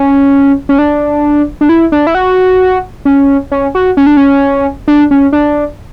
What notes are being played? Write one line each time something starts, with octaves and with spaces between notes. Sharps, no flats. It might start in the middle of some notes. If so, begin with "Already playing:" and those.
Already playing: C#4
C#4
D4
D4
E4
D4
E4
F#4
C#4
C#4
F#4
C#4
D4
C#4
D4
C#4
D4